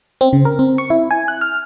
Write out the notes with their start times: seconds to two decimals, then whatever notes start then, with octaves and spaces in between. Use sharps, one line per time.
0.21 C4
0.33 C#3
0.45 A#4
0.59 C4
0.78 C#6
0.90 E4
1.11 G#5
1.28 F#6
1.41 F6